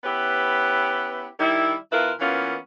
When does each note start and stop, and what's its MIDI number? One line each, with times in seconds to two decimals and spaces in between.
0.04 1.27 59
0.04 1.27 61
0.04 1.27 64
0.04 1.27 67
0.04 1.27 71
1.40 1.75 51
1.40 1.75 55
1.40 1.75 64
1.92 2.12 47
1.92 2.12 64
1.92 2.12 65
1.92 2.12 70
1.92 2.12 71
2.20 2.56 52
2.20 2.56 58
2.20 2.56 59
2.20 2.56 61
2.20 2.56 65